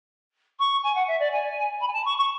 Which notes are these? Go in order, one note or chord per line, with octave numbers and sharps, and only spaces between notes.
C#6
G#5
F#5
E5
D5
G#5
B5
G#5
A5
C#6
C#6